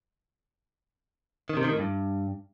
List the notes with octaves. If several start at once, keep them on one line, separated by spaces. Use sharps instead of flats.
D#3
C3
D#3
A2
G2